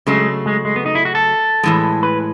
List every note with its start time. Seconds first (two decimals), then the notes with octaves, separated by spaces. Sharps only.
0.07 C#3 F#3 G#3 A3
0.46 G#3
0.65 G#3
0.76 B3
0.86 D#4
0.95 E4
1.05 F#4
1.15 A4
1.63 A2 E3 G#3
2.03 B4